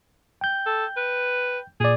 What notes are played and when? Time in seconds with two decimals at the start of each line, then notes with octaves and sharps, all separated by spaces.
0.41 G5 G6
0.66 A4
0.97 B4
1.80 A#2 G#4 D5